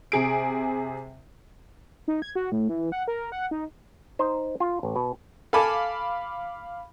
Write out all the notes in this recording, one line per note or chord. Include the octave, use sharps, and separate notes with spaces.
C3 G#4 D7
D#4
G#6
F#4
A2
E3
F#5
A#4
F#5
D#4
D#4 C5
F4
A1
B2
A4 F5 G#5 A5 B5 D6